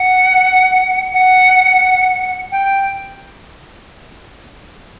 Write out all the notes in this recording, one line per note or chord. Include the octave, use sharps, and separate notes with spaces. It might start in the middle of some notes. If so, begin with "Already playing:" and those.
Already playing: F#5
F#5
G5